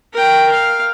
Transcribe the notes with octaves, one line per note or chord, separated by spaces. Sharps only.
A#4 G5
F5